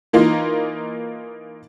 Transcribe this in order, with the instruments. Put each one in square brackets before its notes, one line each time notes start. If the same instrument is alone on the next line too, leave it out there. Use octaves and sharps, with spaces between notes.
[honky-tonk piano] E3 A#3 D#4 F4